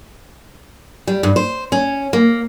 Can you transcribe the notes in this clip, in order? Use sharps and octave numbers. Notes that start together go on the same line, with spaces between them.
G3
G2
C5
C#4
A#3